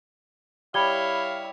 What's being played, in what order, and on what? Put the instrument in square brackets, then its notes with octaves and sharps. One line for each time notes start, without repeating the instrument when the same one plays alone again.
[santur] G3 [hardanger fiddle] E4 C#5 [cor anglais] F5 [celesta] B5 G#6 G7